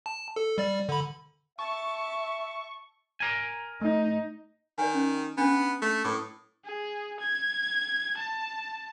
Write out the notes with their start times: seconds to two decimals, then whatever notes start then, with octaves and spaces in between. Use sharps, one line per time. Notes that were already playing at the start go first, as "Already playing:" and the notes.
0.06 A5
0.36 A4
0.58 G3 D5
0.89 D3 B5
1.59 E5 A5 C#6
3.20 A#4 G#5
3.82 A3 D#4
4.78 D#3 D5 G#5
4.94 C#4
5.38 B3 C#4 D4
5.82 A3
6.05 A2 D6 D#6
6.65 G#4
7.20 G#6
8.17 A5